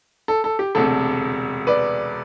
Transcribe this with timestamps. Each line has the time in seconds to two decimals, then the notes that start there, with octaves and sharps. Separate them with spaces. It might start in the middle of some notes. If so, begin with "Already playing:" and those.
0.28 A4
0.44 A4
0.59 G4
0.75 E1 D2 C3 A4
1.67 B4 D5